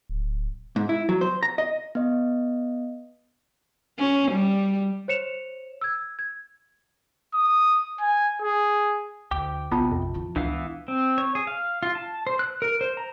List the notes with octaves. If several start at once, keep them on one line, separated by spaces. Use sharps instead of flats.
D1
G#2
E4
F#3
C5
A#5
D#5
B3 D#5
C#4
G3
C5 C#5 C#7 E7 F7
E6 G#6
G#6
D#6
G#5
G#4
D2 G5 D6
A#1 C3 B3 F4 A5
F2
E3 F3
C#2 A2 E3 B3 D4 F5
C4
C#5
G#4
F5
F4
A5
C5
F#6
A#4
C5
A#5